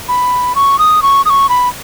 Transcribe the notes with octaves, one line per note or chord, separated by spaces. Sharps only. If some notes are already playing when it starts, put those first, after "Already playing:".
B5
C#6
D#6
C#6
D#6
C#6
B5